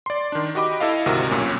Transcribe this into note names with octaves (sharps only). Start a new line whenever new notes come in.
D5 C6
D#3 D4
F#4 G4 D#5 B5 D6
E4 A4 D#5 F5
G#1 D2 C3 F#4 A#4
B1 G2 A#2 C#4